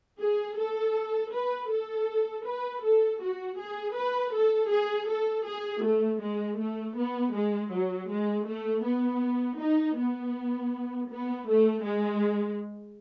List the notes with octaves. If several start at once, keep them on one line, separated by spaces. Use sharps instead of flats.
G#4
A4
B4
A4
B4
A4
F#4
G#4
B4
A4
G#4
A4
G#4
A3
G#3
A3
B3
G#3
F#3
G#3
A3
B3
D#4
B3
B3
A3
G#3